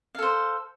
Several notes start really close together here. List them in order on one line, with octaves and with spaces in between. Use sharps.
F5 A4 C5